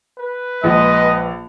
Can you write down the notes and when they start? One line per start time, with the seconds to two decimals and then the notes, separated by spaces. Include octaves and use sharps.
0.18 B4
0.64 A#1 G#3 D#5